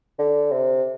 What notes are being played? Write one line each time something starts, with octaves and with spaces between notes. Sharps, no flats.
D3
C3